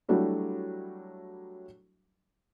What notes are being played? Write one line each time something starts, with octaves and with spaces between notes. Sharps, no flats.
F#3 G3 A3 D4 E4